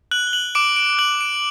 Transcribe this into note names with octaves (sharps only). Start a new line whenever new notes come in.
F#6 F#7
G7
F#7
D6 D7
D7
F#6 F#7
D7